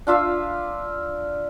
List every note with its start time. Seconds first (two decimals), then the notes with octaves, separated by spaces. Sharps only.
0.07 D4 F4 E5 F5